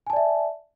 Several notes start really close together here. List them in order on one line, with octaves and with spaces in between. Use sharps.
G#5 A5 D5 E5